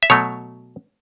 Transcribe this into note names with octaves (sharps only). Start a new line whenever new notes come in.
E5
B2 F#3 A3 C#5